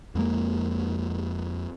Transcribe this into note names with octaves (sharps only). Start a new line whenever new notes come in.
F2 G#3 A#3